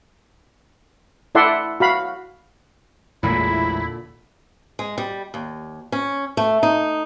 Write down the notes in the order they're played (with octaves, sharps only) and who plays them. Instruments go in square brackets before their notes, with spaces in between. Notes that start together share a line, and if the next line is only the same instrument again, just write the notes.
[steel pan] E4 A4 D5 E5 F#5 C6
F#4 F5 B5
[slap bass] A1 E2 G#3 [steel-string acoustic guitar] A#2 D3 [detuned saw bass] E4 [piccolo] B5
[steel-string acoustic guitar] G#3
G3
D#2
C#4
A3
D#4